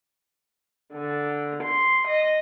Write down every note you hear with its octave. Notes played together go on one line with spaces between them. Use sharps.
D3
C6
D#5